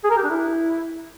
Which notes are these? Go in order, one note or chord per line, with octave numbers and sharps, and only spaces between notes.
G#4
A#4
G4
D4
E4